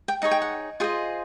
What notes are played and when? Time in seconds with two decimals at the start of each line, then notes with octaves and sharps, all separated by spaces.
0.08 G5
0.22 D#4 G#4 C#5 F#5
0.31 G5
0.42 F#5
0.80 F4 G#4 C5 D#5 F#5